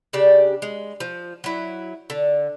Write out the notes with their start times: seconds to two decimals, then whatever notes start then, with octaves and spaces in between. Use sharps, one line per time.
0.13 C#3 D4 G4 D5
0.62 G#3
1.00 F3
1.44 F#3 E4
2.10 D3